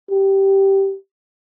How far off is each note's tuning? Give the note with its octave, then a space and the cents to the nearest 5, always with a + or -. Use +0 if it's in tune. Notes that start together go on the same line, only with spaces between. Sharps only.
G4 -10